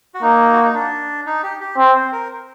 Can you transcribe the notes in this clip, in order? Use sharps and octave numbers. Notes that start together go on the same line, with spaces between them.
F#4
A#3 D#4
F#4
D#4
D4
D#4
G4
G4
C4
C5
A#4